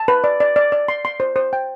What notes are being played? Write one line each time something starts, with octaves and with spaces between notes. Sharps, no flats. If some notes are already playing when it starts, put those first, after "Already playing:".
Already playing: A5
B4
D5
D5
D5
D5
C6
C6
C5
C5
G5